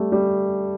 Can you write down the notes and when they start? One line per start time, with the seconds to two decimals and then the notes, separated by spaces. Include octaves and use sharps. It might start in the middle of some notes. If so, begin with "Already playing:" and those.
Already playing: G3 A3
0.12 G3